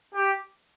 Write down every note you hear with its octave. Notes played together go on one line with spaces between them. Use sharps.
G4